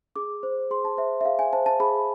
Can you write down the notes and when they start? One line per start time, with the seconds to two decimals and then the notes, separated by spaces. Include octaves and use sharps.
0.16 G#4 D6
0.43 C5
0.71 G#4 C6
0.85 A5
0.97 C5 E5
1.21 E5
1.25 G#4 F5
1.39 G#5
1.53 C5 A5
1.66 A5
1.80 G#4 B5